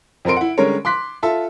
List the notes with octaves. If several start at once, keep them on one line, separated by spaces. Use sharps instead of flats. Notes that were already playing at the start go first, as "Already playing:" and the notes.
F2 C4 A#4 C6 D7
E4 F#5
D3 G3 G#3 C#4 A#4 C#5
C6 D6 F#6 B6
F4 A4 E5